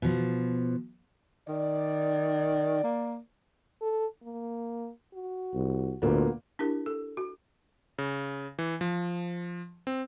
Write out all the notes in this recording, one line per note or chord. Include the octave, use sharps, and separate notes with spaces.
B2 F3
D#3 D5
A#3
A4
A#3
F#4
C2
D2 A#2 A#3 B3
D4 E4 G4 A#4
A4
F#4
C#3
E3
F3
C4